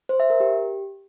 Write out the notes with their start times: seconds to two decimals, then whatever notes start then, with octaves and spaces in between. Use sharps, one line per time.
0.09 C5
0.20 E5
0.30 A#4
0.40 G4